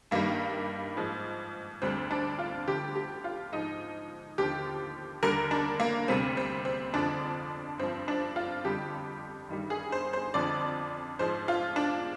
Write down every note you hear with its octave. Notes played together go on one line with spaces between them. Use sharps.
G2 D#3 G3 A#3
G#2 F3
D2 D3 G3 C4
D4
F4
D2 D3 F3 G4
G4
F4
G#2 F3 D#4
D#2 D3 F3 G4
D#2 D3 G3 A#4
D4
A#3
D2 C3 G3 C4
C4
C4
F2 D3 F3 D4
G2 F3 C4
D4
F4
F2 D3 G3 G4
G2 D#3 G3
G#4
C5
C5
F2 D3 F3 D5
G#2 F3 C5
F4
D4